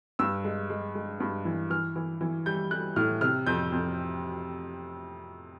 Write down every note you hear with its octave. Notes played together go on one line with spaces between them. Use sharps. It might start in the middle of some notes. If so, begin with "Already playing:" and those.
G2 E6
G#3
G#3
G#3
G2
E3
E3 F6
E3
E3
G3 G6
G3 F#6
A2 F6
C3 F6
F2 G6
F2